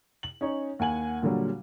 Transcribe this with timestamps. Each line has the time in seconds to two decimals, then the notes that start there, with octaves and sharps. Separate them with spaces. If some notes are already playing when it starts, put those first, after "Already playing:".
0.23 F#7
0.41 C#4 D#4 C#5
0.79 D#2 F#5 G#5 F#7
1.22 A#2 D3 F#3 G3